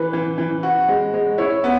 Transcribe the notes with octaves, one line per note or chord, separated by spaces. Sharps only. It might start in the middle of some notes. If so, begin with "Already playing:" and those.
Already playing: E3 B4
E3
E3
F#4
G#3
G#3
E4 C#5
B3